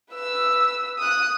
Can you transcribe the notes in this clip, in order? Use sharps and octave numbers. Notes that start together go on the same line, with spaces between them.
B4 E6
D#6 F#6